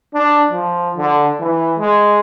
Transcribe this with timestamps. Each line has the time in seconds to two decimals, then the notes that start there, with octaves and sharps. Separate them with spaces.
0.14 D4
0.50 F3
0.97 D3
1.40 E3
1.78 G#3